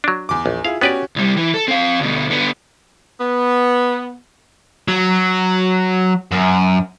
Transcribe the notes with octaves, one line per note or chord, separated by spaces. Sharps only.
F#3 D4
E2 D6
A#1
E4 F4 G#4 F5
B3 C#4 F#4 G4 B4 D5
C2 G3
E3
A4
C4 F5
D2 B2
D3 B3
B3
F#3
F#2